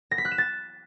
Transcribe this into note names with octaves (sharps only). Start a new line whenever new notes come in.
A#6
B6
F#6
E7
A6